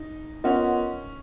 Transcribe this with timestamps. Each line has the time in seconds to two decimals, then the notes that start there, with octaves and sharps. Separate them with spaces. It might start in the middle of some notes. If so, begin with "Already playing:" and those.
Already playing: D#4
0.44 B3 C#4 F4 A#4 D#5 F#5